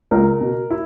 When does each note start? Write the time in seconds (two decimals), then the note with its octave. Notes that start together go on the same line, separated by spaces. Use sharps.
0.11 C#2 A#4
0.41 B2
0.70 E4